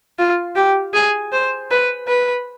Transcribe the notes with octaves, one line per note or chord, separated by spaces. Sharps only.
F4
G4
G#4
C5
B4
B4